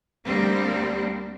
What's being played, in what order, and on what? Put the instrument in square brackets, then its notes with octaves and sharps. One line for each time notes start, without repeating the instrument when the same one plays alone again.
[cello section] D2 G3 A#3 C4 D4